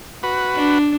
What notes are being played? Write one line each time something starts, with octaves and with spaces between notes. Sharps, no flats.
F#4 B4
D4